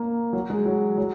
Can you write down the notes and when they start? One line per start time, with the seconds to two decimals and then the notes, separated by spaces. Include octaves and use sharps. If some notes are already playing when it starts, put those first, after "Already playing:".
Already playing: A#3
0.33 F#3
0.50 G#3
0.66 F#3
0.98 F#3